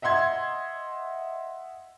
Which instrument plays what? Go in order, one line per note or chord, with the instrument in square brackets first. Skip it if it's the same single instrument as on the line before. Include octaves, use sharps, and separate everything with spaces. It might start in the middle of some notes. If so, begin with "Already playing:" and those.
[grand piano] D#5 E5 F#5 C6 G#6